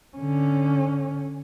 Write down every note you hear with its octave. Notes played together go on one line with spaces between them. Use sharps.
D3 C#4